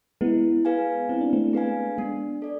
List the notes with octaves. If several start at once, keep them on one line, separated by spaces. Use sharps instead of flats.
G#3 B3 E4
G#4 B4 F5 G#5
C4 E4
D4
A3 C4
G#4 B4 F5 G#5
G#3 B3 D4
A4 D5